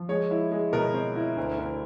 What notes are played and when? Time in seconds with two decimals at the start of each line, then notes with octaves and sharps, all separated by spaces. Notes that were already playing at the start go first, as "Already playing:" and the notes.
Already playing: F3
0.09 G#3 C#5
0.31 E4
0.52 G#3
0.73 B2 A#4
0.94 C4
1.16 E4
1.37 D2
1.58 D2